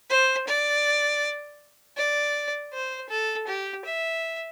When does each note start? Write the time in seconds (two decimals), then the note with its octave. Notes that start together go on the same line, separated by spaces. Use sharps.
0.10 C5
0.48 D5
1.97 D5
2.73 C5
3.09 A4
3.47 G4
3.85 E5